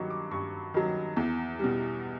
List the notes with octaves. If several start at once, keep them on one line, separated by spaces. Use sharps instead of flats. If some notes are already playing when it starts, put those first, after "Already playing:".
Already playing: G2 D#3 F#3 C#6 D6
D6
G2 C#6
D#3 F#3
E2
B2 G3